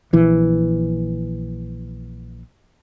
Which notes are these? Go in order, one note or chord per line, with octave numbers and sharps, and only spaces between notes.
A#1 E3